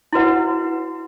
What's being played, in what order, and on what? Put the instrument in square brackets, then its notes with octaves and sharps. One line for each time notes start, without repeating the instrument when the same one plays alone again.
[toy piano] E4 F#4 B4 F#5